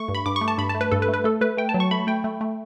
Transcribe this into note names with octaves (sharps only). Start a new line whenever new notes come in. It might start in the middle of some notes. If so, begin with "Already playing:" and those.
Already playing: A3 C#6
G2
B5
G2 D6
C#6
A3
A5
G2 B5
A5
A3
B4
G2 A4
B4
A3
B4
A3 A4
A3 B4
A3 G5
A5
F#3
C#6
A3 B5
A3 G5
A3
A3